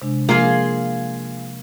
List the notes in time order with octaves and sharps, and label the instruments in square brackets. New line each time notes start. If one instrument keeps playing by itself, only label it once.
[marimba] C3 G#3 D4
[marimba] F3 [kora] A#3 [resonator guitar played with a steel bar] F4 G#4